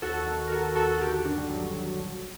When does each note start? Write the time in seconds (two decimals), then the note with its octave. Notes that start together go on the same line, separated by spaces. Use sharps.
0.02 D#2 F#4 A4
0.27 D#3
0.47 A#4
0.52 D#3 F#4 A4
0.75 D#2 F#4 A4
1.00 D3 G4 A#4
1.12 F#4 A4
1.24 G2 D4 F#4
1.37 G3
1.49 G1 F#3
1.59 G3
1.69 F#3
1.75 G1
1.98 A#1